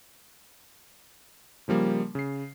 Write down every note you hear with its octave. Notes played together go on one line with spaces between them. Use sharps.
C#3 F3 G3 A#3
C#3 C7